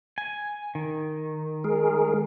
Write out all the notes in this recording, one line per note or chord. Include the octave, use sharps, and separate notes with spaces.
G#5
D#3
G#3 G#4 A#4